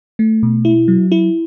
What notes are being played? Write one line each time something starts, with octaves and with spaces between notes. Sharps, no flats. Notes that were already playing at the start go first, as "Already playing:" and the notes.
A3
B2
E4
F#3
E4